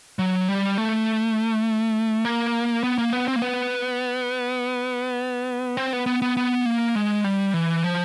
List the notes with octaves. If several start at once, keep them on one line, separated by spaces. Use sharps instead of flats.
F#3
G3
A3
A#3
B3
A#3
B3
C4
A#3
B3
C4
B3
B3
B3
B3
A#3
G#3
G3
E3
F3